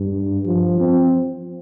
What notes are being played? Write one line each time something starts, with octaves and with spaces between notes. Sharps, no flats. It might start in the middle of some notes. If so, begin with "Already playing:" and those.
Already playing: G2
F3
C4